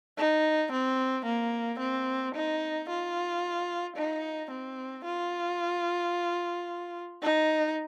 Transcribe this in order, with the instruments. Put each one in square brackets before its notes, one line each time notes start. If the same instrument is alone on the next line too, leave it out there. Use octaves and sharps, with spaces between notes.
[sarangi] D#4
C4
A#3
C4
D#4
F4
D#4
C4
F4
D#4